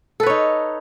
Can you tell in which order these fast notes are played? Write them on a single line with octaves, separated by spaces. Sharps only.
A4 B4 C#5 D#4